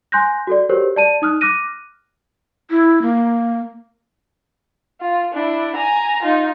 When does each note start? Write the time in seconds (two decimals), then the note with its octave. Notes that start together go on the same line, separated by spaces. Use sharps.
0.12 G#5 C6 F#6 G6 A#6
0.47 F#4 A4 D5
0.69 F#4 G4 A4 A#4 C5 C#5
0.96 D5 A5 D#7
1.22 D#4 D#6 F6 F#6
1.41 D6 F6 F#6 A#6 D#7
2.70 E4
3.02 A#3
5.01 F4
5.33 D4 E4
5.76 G#5 A#5
6.23 D#4 F4